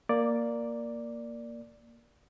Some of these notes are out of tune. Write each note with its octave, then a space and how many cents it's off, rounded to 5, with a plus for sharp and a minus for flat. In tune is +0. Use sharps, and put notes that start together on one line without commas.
A#3 +0 D5 +0